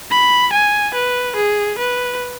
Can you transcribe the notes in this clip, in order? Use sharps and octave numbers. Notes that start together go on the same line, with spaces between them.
B5
G#5
B4
G#4
B4